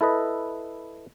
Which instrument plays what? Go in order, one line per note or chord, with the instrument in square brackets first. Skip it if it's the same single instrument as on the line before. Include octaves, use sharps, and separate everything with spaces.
[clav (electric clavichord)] E4 A4 B4 D#5